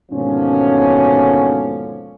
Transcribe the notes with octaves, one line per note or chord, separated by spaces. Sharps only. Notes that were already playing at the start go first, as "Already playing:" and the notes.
D#2 G#2 B2 D3 F3 C#4